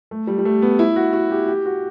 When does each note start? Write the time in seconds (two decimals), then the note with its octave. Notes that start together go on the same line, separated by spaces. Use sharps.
0.11 A3
0.27 G3
0.38 G3
0.45 A3
0.62 B3
0.79 E4
0.96 F#4
1.13 F#4
1.31 G4
1.48 G4
1.66 F#4